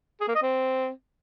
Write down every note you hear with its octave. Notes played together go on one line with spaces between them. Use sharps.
G#4
A#3
D#5
C4